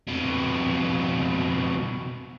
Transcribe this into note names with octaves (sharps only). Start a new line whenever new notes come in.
F2 B2